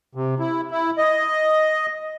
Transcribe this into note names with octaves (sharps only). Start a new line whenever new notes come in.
C3
E4
E4
D#5